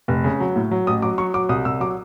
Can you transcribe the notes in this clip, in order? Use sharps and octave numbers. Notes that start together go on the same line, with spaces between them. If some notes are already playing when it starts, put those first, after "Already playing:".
F1
C#3
F#3
A2
F#3
A1 D#6
F#3 D6
F#3 C#6
F#3 D6
C2 D#6
C2 E6
F#3 D6